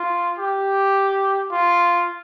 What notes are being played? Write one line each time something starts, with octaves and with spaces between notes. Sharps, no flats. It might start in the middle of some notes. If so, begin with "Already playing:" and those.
Already playing: F4
G4
F4